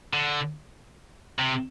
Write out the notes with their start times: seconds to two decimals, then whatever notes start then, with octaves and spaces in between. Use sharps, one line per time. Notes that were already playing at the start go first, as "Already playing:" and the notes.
0.14 D3
1.38 C3